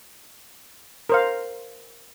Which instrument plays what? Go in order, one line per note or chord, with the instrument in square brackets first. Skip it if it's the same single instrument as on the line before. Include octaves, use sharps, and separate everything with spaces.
[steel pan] A#4 C5 F5